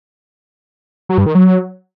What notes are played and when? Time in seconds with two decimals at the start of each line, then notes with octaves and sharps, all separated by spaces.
1.09 F#3
1.18 G2
1.26 D#3
1.35 F#3